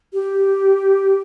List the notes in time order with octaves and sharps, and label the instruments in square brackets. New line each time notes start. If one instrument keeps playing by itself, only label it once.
[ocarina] G4